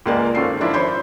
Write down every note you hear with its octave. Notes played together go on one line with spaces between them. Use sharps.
C#2 G#3 A#3 A#4 D5 G#5
G#1 C#4 F4 A4 C7
F3 D4 E4 F4 A#4
C5 C#5 B5 C6 G6